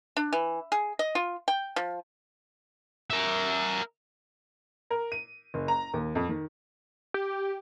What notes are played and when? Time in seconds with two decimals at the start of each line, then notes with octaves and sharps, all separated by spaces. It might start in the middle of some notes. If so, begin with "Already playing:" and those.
0.17 D4
0.33 E3
0.72 G#4
0.99 D#5
1.15 F4
1.48 G5
1.76 F3
3.10 A#4 E5
4.90 A#4
5.12 D#7
5.54 F#1
5.68 A#5
5.94 D#2
6.15 F2
6.29 D#3
7.14 G4